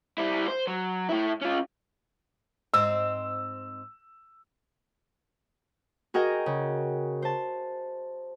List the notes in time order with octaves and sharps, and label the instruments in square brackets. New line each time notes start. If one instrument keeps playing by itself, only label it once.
[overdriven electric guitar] G3 E4
C5
F#3
A2 E4
C#4 F4
[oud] G#2 C4 D#5 [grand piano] E6
[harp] F#4 G#4 A#4 D#5 G5
C#3
C5 A5